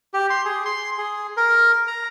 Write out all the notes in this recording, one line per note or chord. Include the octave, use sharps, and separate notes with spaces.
G4
C6
G#4
C6
G#4
A#4
A#5